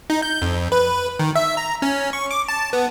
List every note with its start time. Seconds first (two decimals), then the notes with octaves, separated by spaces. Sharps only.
0.10 D#4
0.22 G6
0.42 F2
0.72 B4
1.19 D#3
1.35 E5
1.57 A#5
1.82 C#4
2.13 C#6
2.31 D6
2.48 A5
2.73 B3